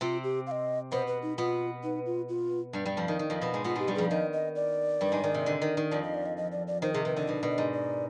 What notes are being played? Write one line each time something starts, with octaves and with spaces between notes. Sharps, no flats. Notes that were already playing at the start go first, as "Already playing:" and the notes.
C3 C4 F4
G4
F5
D#5
B2 B3 C5
B4
D#4
B2 B3 F4
D#4
F4
F4
G2 G3
G2 G3
F2 F3
D#3
D#3
F2 F3
B2 B3
G#2 G#3
B2 B3 F4
G#2 G#3 G4
G2 G3
F2 F3 G#4
D#3 D#5
D#5
D5
G2 G3
G#2 G#3
D#3
C3
D3
D#3
D#3
F2 F3 D5
D#5
D5
D#5
D#5
D5
D5
D#3 C5
C3 G#4
C3 B4
D3 D#5
B2 D5
B2
D#5
G#2
D5